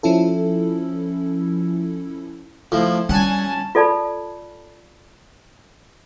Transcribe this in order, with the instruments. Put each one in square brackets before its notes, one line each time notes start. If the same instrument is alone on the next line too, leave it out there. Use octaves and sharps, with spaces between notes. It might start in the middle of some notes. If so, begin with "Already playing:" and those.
[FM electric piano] F3 C#4 E4 A4
[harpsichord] A2 F3 [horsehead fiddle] E4 C5
[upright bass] G3 [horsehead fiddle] C#4 A5 [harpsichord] F#5 G#5
[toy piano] F4 A4 D5 A5 B5